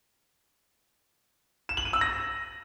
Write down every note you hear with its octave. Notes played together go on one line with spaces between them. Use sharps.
E7
F#7
D#7
E6
A#6